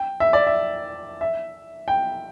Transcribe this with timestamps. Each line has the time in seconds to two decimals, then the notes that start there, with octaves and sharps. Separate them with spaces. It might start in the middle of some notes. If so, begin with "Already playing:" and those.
Already playing: G5
0.20 E5
0.33 D5
0.47 E5
1.21 E5
1.88 G5